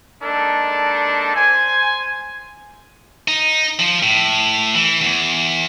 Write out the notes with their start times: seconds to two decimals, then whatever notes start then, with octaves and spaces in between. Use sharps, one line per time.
0.23 G#3 A#3 D4 D#4 A4
1.36 C5 G#5
3.28 D#4
3.79 F3
4.03 A2
4.75 E3
5.01 E2